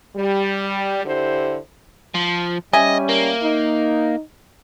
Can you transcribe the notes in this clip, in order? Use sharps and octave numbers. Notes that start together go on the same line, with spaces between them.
G3
D3 E4 G4 C5
F3
G3 C#4 D#5 E5 G#5
A#3
D#4